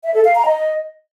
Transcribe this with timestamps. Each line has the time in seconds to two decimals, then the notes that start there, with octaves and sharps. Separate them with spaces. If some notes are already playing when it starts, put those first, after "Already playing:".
0.04 E5
0.14 A4
0.25 F5
0.35 A#5
0.46 D#5